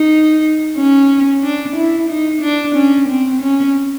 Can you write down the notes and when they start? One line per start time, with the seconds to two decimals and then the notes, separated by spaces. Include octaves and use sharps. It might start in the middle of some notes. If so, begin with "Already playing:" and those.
Already playing: D#4
0.76 C#4
1.43 D4
1.76 E4
2.09 D#4
2.42 D4
2.75 C#4
3.09 C4
3.42 C#4